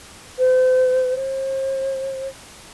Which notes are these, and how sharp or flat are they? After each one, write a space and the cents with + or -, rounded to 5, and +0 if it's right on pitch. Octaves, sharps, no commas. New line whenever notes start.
C5 -35
C5 +40